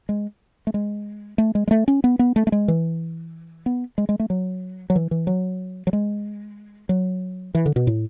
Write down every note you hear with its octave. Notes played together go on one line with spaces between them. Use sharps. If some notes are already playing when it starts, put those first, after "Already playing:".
G#3
A3
G#3
A3
G#3
G#3
A3
C#4
B3
B3
A3
A3
G#3
E3
B3
G#3
G#3
A3
F#3
F#3
E3
E3
F#3
F#3
G#3
F#3
E3
D3
B2
A2